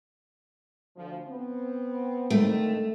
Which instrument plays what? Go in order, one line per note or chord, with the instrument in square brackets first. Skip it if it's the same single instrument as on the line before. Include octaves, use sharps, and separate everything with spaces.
[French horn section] D2 F3
B3 C4
[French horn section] F2 D3 D#3 [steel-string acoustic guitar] A3